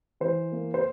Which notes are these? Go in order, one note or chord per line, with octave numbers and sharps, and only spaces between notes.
E3 C5
A#3
C5